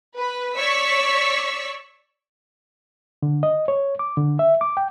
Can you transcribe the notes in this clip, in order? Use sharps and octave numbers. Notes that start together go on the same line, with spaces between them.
B4
C#5 D5 C#6 E6 B6
D3
D#5
C#5
D6
D3
E5
D6
G5